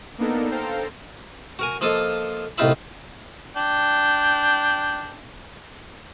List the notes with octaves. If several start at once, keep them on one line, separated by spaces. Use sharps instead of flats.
A#3 B3 D4 D#4 A4 A#4
A4 C5 F5 G5 A#5
F#4 A#4 G#5
F3 A#3 F4 A4 D#5
C2 A2 D#4 F4 E5 B5
D4 G5